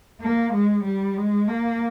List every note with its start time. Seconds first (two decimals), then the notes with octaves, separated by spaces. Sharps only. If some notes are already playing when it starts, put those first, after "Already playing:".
0.21 A#3
0.52 G#3
0.84 G3
1.17 G#3
1.48 A#3